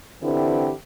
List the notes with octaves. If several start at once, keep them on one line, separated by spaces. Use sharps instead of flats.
D3 E3 C4 E4 G4 B4